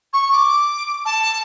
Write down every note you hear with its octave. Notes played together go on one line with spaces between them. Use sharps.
C#6
D6
A5